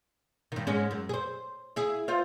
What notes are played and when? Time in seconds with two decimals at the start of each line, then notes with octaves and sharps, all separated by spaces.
0.52 G2 D#3
0.67 G#2 G#3 C#4
0.91 F#2
1.09 G#4 C5
1.76 E4 G#4
2.08 F4 C5